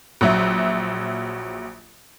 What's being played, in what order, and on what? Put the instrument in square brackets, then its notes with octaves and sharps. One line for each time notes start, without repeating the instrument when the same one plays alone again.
[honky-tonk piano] A#1 F#3 E5